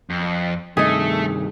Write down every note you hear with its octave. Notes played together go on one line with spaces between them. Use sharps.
F2
G2 C3 D#3 A3 G#4 D#5